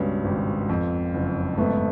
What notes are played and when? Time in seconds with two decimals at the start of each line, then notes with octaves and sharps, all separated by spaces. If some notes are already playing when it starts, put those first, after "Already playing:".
Already playing: C#2 G2 B2 B3 C#4
0.24 G#1
0.69 F2
1.14 F#1
1.58 G#2 A3 B3